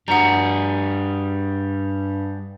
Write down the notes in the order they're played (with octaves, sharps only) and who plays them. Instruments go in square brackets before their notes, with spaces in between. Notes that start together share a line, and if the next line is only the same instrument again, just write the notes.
[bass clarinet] G2 [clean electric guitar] G3 F#4 G#4 [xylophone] F#5 A#5